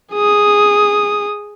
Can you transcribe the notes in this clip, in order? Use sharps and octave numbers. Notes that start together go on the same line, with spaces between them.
G#4 D#6